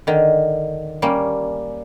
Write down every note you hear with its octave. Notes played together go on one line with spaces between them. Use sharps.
D3 D#3
G3 A#3 C#4